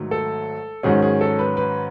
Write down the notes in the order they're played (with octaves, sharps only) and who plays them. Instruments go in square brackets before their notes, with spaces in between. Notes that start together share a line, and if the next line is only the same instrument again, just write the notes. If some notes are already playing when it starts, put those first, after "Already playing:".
Already playing: [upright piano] G#2 D#3 F#3 A3
A4
G#2 D#3 F#3 C#4 G#4
G#4
A4
B4
B4